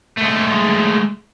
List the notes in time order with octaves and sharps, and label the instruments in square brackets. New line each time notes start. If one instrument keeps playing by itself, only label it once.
[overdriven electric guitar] G#3 A3